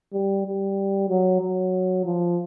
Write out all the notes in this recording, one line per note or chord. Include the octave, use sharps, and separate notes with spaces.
G3
G3
F#3
F#3
F3